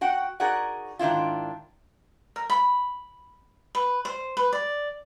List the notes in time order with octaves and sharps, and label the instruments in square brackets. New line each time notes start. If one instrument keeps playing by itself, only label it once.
[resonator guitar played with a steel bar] F#4 F#5 G5
D#4 F#4 G#4 A#4 D5 F#5
G#2 D#3 D4 E4 F4
[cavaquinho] A#4
B5
B4
C5
B4
D5